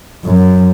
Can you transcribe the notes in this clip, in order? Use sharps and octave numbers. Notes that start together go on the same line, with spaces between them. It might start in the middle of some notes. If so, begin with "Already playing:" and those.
F#2